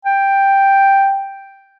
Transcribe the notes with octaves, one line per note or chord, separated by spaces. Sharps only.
G5